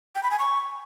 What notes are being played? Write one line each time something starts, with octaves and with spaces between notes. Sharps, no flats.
G5
B5
G#5
C#6